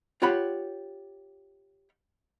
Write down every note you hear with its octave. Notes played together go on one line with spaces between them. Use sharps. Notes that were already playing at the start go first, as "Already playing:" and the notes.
F4 G4 C#5 F#5 B5